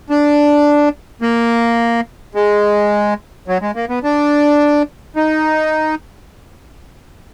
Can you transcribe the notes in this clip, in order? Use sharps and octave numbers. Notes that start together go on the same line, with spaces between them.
D4
A#3
G#3
F#3
G#3
A#3
B3
D4
D#4